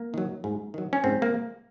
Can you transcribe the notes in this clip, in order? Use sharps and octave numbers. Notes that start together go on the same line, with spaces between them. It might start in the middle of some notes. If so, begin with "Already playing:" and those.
Already playing: A#3
D#3 F#3
G#2
D#3 F#3
C#4
G#2 C4
A#3